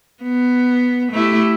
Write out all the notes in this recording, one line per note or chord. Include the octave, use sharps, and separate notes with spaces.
B3
A3 E4 G4